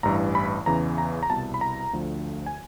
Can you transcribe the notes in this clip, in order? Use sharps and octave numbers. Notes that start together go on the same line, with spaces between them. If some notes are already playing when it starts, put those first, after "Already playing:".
A1 G2 E3 A#5
B5
E2 C#3 E3 A#5
A#5
A#5
C2 B2 A5
B5
A#5
D2 D3 F3
G#5